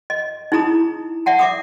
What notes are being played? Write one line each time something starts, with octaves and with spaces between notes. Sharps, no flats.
D#5
D#4 E4 G#4 A#5 D#6
D5 E5 F#5 A5
E5 D6 D#6